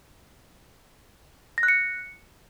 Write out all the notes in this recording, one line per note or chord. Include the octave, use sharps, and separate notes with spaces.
A#6
F#6
C#7